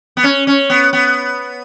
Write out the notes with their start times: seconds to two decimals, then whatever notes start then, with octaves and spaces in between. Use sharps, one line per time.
0.17 B3
0.23 C#4
0.47 C#4
0.70 B3
0.93 B3